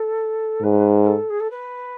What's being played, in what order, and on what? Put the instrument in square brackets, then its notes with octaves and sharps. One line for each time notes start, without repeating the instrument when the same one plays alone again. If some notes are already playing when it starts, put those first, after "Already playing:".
Already playing: [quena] A4
[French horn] G#2 [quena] B4
[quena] B4
A4
G#4
A4
B4